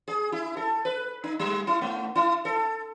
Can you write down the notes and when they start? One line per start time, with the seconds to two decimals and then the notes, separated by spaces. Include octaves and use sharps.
0.08 G#4
0.32 E4
0.57 A4
0.85 B4
1.24 D#4
1.39 G3
1.67 E4
1.81 A3
2.15 E4
2.45 A4